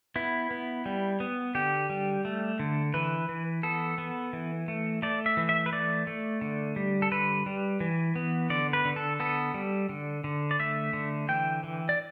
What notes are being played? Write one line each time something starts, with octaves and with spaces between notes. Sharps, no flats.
B3 E4
B3
G3
B3
D3 G4
G3
A3
D3
E3 B4
E3
B3 A4
B3
E3
A3
A3 D5
E5
E3
E5
B4
A3 D5
A3
D3
G3
A4
D3 B4
G3
E3
B3
D3 D5
B4
D3
A4
B3 A4
G3
D3
D3
D5
A3 E5
D3
E3 G5
E3
D5